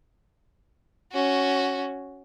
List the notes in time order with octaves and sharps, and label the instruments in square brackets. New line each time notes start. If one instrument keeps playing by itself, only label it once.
[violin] C#4 F#4